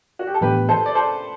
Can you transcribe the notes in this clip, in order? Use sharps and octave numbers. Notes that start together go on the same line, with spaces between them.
F#4
G4
A4
A2 E3 B3 D4 G4 B4
A4 C5
D5
A4 C5